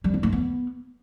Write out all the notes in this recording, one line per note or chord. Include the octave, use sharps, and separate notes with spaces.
G3
C4
A3
B3